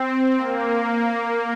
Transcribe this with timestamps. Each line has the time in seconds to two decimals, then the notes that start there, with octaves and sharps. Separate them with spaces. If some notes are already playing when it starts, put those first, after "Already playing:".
Already playing: C4
0.37 A#3